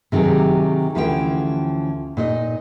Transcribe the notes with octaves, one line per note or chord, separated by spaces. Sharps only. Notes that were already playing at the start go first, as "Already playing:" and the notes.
C3 D#3 F#3 G4 G#4
D2 E3 F3 C#4 D#5 G5
A#2 D#4 D#5